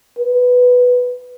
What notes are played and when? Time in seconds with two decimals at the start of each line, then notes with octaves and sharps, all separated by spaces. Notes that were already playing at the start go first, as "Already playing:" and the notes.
0.18 B4